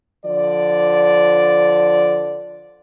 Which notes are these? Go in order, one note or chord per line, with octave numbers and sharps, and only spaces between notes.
D3 F3 D5